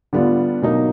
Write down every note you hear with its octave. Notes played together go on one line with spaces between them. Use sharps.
D3 G3 B3 D4 F4
B2 F#3 A#3 D#4